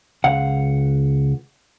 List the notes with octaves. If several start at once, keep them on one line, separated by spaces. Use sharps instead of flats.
C#2 F5 F#5